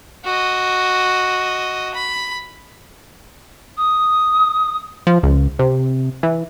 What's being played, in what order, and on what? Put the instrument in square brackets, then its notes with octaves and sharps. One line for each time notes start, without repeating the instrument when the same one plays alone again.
[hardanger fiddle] F#4 D#5
B5
[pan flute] D#6
[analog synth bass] F3
C#2
C3
E3